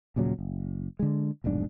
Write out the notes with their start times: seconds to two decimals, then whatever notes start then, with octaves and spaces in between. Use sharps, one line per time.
0.16 D#1 A#2 C#3 F#3
0.39 F#1
0.99 D3 G#3
1.44 F1 B1 G#2 D4